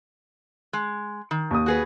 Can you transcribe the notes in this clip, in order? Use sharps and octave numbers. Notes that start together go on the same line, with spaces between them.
G#3
D#3
D#2 D#6
F#4 G#4 B4